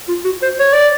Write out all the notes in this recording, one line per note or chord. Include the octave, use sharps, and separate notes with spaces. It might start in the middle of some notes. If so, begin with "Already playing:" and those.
F4
F#4
C5
C#5
D5